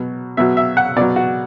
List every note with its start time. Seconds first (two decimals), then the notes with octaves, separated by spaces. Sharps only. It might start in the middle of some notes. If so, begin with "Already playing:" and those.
Already playing: B2 F#3
0.37 B2 F#3 E5
0.57 E5
0.77 F#5
0.96 B2 F#3 D5
1.16 F#4